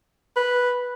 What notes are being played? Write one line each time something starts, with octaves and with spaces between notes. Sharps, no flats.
B4